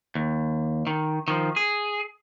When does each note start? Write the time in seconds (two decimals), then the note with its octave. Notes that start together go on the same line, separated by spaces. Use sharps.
0.15 D#2
0.87 D#3
1.28 D#3 F3
1.56 G#4